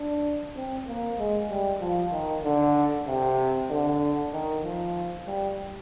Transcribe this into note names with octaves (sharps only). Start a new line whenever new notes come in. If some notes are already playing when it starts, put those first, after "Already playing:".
Already playing: D4
C4
A#3
G#3
G3
F3
D#3
D3
C3
D3
D#3
F3
G3